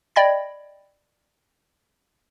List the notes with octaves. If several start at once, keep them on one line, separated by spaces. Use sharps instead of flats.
D5 D#5 G5 B5 G#6 A#6